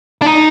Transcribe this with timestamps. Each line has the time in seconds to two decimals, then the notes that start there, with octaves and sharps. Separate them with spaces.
0.22 D4
0.26 D#4